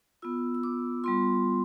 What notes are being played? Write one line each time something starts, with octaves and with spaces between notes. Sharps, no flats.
B3 F4 E6
E6
D6
G3 B3 F4 C6